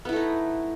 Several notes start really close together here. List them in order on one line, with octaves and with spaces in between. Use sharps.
B3 E4 A3 D#4